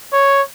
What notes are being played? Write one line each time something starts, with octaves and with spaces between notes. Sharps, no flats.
C#5